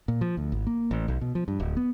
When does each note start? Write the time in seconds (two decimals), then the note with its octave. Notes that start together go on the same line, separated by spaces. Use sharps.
0.08 A#2
0.21 F3
0.37 D2
0.52 G#1
0.67 A#3
0.91 A1
1.08 B1
1.21 B2
1.35 F3
1.48 G2
1.60 D1
1.77 B3